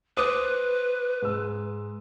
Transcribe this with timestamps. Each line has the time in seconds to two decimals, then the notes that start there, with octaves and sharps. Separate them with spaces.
0.17 B4 C5 D6 D#6
1.22 G#2 E6